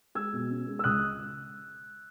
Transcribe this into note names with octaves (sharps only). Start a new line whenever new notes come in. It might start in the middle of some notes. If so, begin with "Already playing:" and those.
G#3 E6 G#6
B2
C#4
G#3
E6
C#2 D#6 F#6